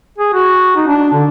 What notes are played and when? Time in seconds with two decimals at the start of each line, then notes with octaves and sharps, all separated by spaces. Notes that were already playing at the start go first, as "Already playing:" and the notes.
0.18 G#4
0.33 F#4
0.76 D#4
0.87 D4
1.13 D3